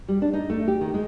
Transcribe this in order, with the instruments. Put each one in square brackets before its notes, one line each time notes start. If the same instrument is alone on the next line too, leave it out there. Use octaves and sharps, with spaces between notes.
[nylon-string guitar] G3
D4
D#4
A3
G4
D#3
G#3